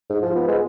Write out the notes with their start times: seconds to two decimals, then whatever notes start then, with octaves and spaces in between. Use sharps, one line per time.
0.10 G#2
0.22 F3
0.36 B3
0.48 G#3